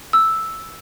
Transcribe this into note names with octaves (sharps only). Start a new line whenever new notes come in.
E6